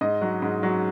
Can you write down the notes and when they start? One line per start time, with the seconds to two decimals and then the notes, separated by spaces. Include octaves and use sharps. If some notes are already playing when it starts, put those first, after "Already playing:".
0.01 G#2 D#5
0.21 F#3
0.42 G#2
0.63 F#3